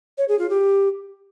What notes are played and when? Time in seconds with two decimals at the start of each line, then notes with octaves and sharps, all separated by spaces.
0.18 C#5
0.28 G#4
0.39 F4
0.49 G4